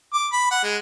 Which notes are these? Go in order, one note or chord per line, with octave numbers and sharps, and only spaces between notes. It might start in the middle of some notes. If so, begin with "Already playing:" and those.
D6
B5
F#5
G#3